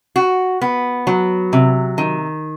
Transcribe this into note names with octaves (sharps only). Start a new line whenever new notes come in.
F#4
B3
F#3
C3
D#3